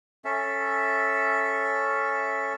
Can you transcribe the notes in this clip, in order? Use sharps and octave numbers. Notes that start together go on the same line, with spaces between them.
C#4 A4 E5